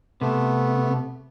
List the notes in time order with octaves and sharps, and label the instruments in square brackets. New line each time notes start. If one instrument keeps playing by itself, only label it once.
[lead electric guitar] C3 [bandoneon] A3 B3